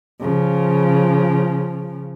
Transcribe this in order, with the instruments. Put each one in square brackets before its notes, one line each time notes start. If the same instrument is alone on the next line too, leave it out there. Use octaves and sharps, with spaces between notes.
[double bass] C#3 F3